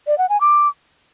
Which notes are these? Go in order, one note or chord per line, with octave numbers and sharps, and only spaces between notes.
D5
F#5
G#5
D6